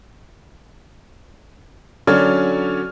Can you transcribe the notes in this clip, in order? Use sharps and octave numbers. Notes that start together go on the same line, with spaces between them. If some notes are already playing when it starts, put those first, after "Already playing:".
D3 F#3 C#4 C#5 D5 F6